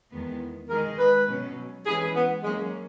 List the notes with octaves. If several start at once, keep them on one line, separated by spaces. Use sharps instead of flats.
E2 D#3 G#3 B3
D#3 G#3 D#4 G#4 A#4 D#5
B4
B2 F#3 C#4
E3 G#3 C#4 E4 G#4 B4
B3
F#3 G#3 A#3 C#4